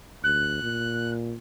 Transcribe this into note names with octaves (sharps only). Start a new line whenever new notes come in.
D2 F#6
A#2